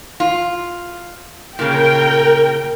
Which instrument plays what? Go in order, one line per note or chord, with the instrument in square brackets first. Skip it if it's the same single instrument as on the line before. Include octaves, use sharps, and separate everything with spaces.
[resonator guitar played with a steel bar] F4
[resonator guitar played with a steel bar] A#2 C#3 [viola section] A#4 G5